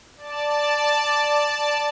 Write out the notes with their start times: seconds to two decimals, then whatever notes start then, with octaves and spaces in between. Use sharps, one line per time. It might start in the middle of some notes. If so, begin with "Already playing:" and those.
0.17 D5 A5